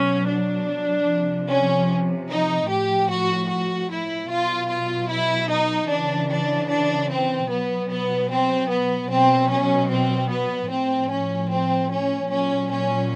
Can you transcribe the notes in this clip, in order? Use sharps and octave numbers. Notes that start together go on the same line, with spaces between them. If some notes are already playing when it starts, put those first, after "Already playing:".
Already playing: B2 F#3 C#4
D4
C3 F3
C#4
D#4
A2 F3 G4
F#4
F#4
E4
B2 F#3 F4
F4
E4
D#4
C#3 E3 D4
D4
D4
C4
B2 F#3 B3
B3
C4
B3
B2 F#3 C4
C#4
C4
B3
A2 F3 C4
C#4
C4
C#4
A#2 F#3 C#4
C#4